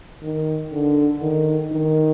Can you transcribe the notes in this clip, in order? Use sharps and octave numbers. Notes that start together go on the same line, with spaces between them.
D#3
D3
D#3
D#3